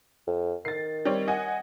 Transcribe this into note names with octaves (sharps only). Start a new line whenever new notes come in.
F2
D#3 A6 C7
G3 C4 C#5
D#5 F#5 G#5